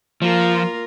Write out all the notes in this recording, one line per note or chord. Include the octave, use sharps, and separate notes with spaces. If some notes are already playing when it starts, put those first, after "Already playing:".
F3 A#3 F4 A#4